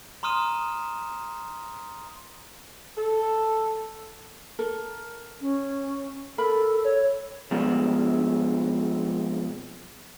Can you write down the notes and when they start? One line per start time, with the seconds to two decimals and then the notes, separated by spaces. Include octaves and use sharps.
0.23 A#5 C6 D#6 F6 D#7 E7
2.96 A4
4.59 A4 A#4
5.41 C#4
6.38 A4 A#4 B5
6.85 C#5
7.51 B2 F3 G3 G#3 B3 C4